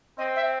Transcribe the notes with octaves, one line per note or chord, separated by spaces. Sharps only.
C4 D#5
E5